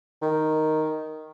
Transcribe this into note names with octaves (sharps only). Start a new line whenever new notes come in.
D#3